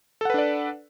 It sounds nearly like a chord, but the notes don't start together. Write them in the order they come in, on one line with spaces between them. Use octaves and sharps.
A4 F#5 B4 D4 D5